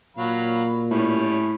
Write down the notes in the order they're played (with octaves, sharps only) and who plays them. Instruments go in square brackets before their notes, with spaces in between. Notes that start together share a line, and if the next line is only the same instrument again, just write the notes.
[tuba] A#2 [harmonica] F#3 F5 B5
[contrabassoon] A2 [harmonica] G3 C#4